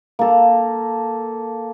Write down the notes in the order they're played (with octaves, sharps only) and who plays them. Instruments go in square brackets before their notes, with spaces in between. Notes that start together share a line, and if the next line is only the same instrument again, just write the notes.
[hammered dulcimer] A#3 A4